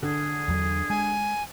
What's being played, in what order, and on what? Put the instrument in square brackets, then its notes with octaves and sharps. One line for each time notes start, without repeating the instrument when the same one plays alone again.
[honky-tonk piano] D3 [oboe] G#4
[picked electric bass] E2 F#3
[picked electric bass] G#3 [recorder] G#5